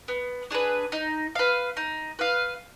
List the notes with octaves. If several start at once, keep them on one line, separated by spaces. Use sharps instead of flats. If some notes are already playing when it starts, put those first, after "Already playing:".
B3
D4 G#4 B4
D#4
B4 F5
D#4
B4 F5